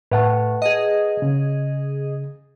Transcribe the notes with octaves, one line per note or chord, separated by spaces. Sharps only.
A2 B4 F#5 A5
G#4 D#5
C#3